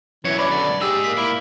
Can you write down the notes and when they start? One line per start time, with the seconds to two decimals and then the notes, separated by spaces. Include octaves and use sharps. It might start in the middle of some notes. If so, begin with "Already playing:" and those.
0.25 F#2 B2 E3 C#5
0.38 C#5 D5 B5
0.51 D3 D5
0.82 G#2 G4 G#4 E6
1.04 A#3 B6
1.17 A#2 E4 D5